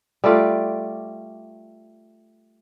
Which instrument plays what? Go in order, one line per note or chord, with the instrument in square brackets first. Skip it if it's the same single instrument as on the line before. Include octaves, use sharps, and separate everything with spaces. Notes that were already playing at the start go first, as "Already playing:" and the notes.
[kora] G3 A3 F4 D5